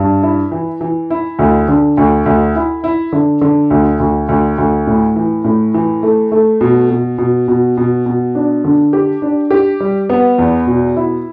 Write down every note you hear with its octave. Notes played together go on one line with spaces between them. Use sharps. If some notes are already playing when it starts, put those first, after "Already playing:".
Already playing: G2
E4
E3
E3
E4
D2
D3
D2
D2
E4
E4
D3
D3
D2
D2
D2
D2
A2
E3
A2
E3
A3
A3
B2
B2
B2
B2
B2
B2
D4
D3
G4
D4
G4
G3
B3
E2
B2
E4